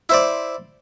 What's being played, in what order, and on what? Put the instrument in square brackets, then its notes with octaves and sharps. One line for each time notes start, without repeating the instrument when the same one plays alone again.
[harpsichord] E4 C5 D5